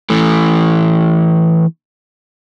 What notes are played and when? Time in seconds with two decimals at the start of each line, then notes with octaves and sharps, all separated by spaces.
0.10 E3 A3